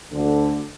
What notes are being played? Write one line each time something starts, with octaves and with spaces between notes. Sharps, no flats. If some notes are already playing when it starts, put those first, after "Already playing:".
D2 D3